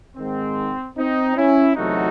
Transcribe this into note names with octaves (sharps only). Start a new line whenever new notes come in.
G#2 D#3 G#3 C4
C4 D#4
C#4 E4
E2 C3 F#3 A3 D#4 F#4